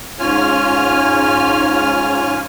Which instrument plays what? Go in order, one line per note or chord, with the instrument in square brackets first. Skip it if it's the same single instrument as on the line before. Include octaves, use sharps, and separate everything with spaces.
[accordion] G#2 C#4 F4 G#5 F6